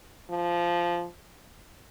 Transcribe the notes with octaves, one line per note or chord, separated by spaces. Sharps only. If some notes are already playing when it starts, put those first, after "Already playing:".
F3